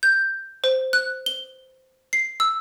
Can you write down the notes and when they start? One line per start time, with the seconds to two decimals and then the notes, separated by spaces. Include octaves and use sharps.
0.03 G6
0.64 C5
0.93 F#6
1.26 G7
2.13 C7
2.40 E6